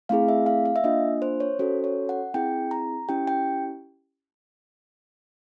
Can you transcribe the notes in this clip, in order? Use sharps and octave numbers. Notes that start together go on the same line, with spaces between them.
A3 C4 E4 G#4 F5
E5
F5
F5
E5
A#3 D4 F4 D#5
C5
C#5
C#4 F#4 A4 C5
C#5
F#5
C4 E4 G#4 G5
A#5
C#4 E4 G4 G5
G5